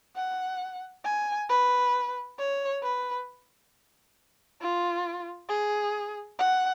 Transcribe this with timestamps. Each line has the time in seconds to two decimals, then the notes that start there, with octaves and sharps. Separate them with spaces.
0.16 F#5
1.05 G#5
1.49 B4
2.38 C#5
2.83 B4
4.61 F4
5.49 G#4
6.38 F#5